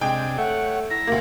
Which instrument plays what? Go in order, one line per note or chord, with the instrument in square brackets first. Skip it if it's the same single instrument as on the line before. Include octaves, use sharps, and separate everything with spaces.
[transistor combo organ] C3 D4 G#4 [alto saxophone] G#3 [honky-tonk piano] G5
[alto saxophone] A3 [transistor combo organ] C#5 [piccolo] F#5
[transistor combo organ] E4 A#5 [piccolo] A#6
[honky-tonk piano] D2 A#3